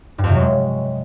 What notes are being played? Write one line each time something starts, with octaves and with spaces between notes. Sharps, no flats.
G2
F2
C3
F#3
G#3